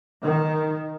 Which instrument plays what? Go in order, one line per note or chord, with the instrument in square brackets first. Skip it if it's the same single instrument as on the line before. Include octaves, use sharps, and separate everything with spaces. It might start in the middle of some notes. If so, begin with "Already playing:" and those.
[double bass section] D#3